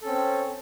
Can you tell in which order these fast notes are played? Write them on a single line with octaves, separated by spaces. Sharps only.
A4 C#4 C4